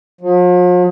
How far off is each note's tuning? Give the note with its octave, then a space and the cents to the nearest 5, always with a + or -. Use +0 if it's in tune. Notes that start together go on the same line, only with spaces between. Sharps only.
F3 +45